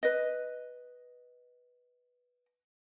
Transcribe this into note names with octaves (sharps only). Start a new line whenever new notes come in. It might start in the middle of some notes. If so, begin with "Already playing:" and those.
B4 D#5